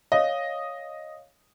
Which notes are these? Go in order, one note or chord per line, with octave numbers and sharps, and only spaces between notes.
C#5 D#5 F5